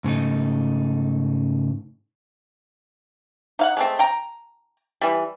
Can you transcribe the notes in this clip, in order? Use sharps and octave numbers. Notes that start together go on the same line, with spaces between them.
G#2 C#3 A3 D#4
D#4 F5 F#5
G#3 A3 C4
G5 A#5
E3 G3